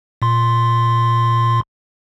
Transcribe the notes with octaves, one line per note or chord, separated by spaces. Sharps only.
A#2 C6